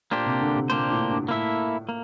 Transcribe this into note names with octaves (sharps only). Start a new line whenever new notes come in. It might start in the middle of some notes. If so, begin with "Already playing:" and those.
A#2 A#3 D4 G4 C5
C3
D3
C3
A#2 A#3 D4 G4 C5
A2
G2
A2 A#3 E4 A4 E5
A#3